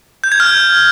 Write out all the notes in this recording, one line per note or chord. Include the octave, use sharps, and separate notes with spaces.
G6
G#6
F6